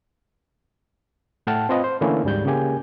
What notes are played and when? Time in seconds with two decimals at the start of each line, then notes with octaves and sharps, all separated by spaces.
1.47 A2 A3 F#5 G5 A5 F6
1.69 C4 F4 B4 D#5
1.84 C5
2.01 D3 E3 A3 A#3 C#4 E4
2.24 D2 G#2 G3 G6
2.45 C#3 A#3 G4 G#5